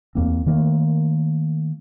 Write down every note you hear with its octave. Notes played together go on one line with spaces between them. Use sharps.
E2 A#3 C4
D#3 A3 A#3